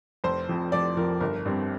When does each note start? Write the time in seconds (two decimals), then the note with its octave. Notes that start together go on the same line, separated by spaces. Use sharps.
0.24 F1 C5
0.49 F2 F3
0.72 F1 D5
0.97 F2 F3 A#4
1.20 G1 A#4
1.46 G2 G3 C4